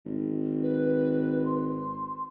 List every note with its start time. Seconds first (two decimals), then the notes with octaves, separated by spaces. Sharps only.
0.06 G#1
0.63 B4
1.45 C6